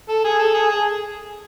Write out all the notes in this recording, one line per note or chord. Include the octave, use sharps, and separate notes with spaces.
A4
G#4
A4
G#4
G#4